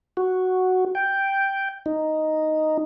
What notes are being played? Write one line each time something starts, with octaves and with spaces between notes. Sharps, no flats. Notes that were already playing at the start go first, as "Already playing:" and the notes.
F#4
G5
D#4